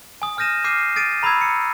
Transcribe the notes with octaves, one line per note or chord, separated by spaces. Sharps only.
G#5 D#6
G#5 F6 G6 A#6 D#7 E7
D6 F6 G6 C7 D#7
D#6 A6 D7 D#7
A#5 B5 D#6 E6 G#6
C#7